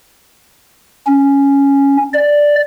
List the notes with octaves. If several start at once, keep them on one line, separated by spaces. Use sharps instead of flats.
C#4
D5